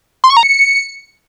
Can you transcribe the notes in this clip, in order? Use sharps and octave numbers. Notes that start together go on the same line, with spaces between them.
C6
C#6
A#5
C#7